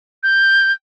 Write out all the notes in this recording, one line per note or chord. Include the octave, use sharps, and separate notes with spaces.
G6